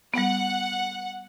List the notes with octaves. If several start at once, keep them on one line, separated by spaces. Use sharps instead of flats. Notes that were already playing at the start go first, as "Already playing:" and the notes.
G3 B3 F#5